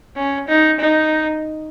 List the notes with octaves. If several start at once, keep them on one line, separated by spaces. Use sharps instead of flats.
C#4
D#4
D#4